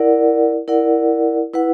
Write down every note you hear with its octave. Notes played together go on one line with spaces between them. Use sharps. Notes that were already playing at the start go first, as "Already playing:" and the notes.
Already playing: E4 A#4 D5 F#5
E4 A#4 D5 F#5
E4 B4 F#5